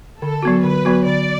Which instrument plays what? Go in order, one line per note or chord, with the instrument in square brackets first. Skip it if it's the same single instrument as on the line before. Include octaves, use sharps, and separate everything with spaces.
[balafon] D3 [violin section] A4
[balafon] F#3 B3 F#4
[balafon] D3 [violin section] B4
[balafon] F#3 B3 F#4
[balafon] D3 [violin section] D5